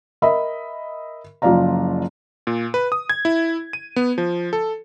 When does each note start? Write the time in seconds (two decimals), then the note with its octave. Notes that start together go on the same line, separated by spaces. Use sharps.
0.22 A#4 D#5 E5 B5
1.42 F#1 F3 F4 D5 F5 A#5
2.47 A#2
2.74 B4
2.92 D#6
3.10 G#6
3.25 E4
3.73 D#7
3.96 B3
4.18 F3
4.53 A4